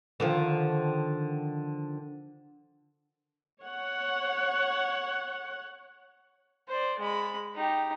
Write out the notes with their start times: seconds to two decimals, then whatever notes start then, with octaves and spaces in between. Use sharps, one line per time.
0.20 D3 D#3 F3
3.63 C#5 F#5
6.69 C5 D5
7.00 G#3 B5
7.55 D#4 G4